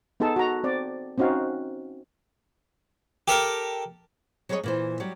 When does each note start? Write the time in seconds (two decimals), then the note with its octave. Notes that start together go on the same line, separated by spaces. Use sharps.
0.20 B3 D#4 G#4 A4 A5
0.36 F#4 A#5
0.64 C4 D5
1.18 C4 C#4 D#4 F#4 F5
3.28 G4 A4 A#4
4.49 F#3 G3 G#4 B4 C#5 D#5
4.64 A#2 E3 C5
5.00 F#3 G3 G4